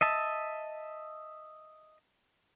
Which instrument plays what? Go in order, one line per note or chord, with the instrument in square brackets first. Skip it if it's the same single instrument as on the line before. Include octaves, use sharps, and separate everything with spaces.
[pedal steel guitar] D#5 E5 A5